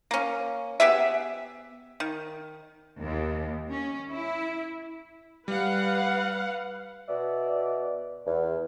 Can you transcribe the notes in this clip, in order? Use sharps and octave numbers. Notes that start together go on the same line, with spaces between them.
A#3 C#4
B3 G4 G#4 E5
D#3
D#2
C#4
E4
G3 B4 F5 F#5
B2 D5 E5
E2